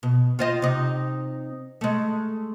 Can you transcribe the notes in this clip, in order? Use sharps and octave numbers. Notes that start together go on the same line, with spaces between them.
B2
F4 C5 D#5
C3 D#4
G#3 A3